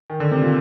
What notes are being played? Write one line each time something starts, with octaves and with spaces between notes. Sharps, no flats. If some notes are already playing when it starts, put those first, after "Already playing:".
D#3
D3
C3
A#2